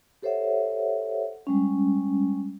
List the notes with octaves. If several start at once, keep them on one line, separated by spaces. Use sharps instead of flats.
G4 A4 C5 C#5 E5 F#5
G3 G#3 C#4